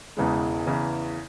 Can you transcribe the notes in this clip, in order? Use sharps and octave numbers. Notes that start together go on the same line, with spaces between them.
E1 E2 C#3 E3 G#3
E2 C#3 E3